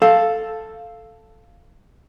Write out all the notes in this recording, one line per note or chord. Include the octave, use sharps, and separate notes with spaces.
A4 F5